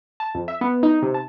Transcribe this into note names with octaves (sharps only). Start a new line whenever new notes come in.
A5
F2
E5
B3
D#4
C3
A5